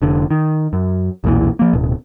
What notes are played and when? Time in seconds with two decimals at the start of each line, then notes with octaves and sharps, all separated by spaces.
0.02 F1 D3
0.31 D#3
0.73 F#2
1.24 B1 E2 A#2 E3
1.59 F3 A#3
1.73 D1 B2